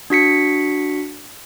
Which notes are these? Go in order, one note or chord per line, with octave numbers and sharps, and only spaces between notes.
D4 F#4 B6 C#7